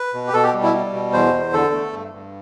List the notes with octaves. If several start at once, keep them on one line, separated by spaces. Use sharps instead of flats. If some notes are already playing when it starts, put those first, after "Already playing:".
Already playing: B4
B2
G4
B2 A4
G4
G3
E4
G3
B2
E2 C5
E2
D3 A4
A3
G2
G2